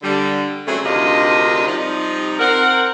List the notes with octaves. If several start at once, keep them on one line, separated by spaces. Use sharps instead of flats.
D3 G3
C#3 F#3 G3 A3 C4 G#4
D2 C3 D#3 D4 F4 D#5
C3 F3 G3 D#4
C4 A#4 F#5